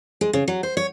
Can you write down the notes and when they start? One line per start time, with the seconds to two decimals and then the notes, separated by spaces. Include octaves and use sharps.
0.21 G#3
0.33 C#3
0.48 F#3
0.63 C5
0.77 C#5